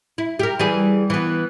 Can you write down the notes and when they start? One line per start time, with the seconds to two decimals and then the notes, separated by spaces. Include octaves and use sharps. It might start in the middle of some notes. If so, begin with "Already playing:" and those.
0.18 E4
0.39 G4 A#4
0.60 E3 G3 G#4
1.10 E3 B3